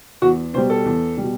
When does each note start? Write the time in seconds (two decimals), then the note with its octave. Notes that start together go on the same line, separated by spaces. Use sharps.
0.22 E2 F#4
0.54 B2 C5
0.57 G3
0.70 A4
0.85 E2
1.17 B2 G3